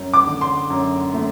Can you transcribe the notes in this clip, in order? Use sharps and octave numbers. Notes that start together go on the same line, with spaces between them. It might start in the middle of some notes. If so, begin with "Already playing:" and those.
Already playing: F#2
D6
D3
C6
F#2
A3